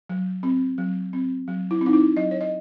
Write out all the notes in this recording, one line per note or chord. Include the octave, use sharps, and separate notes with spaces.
F#3
C4
F#3
C4
F#3
E4
C4
D#4
E4
F#3 D#5
C#5
D#5